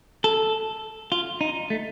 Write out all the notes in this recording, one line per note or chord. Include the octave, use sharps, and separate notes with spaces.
A4
F4
D#4
A3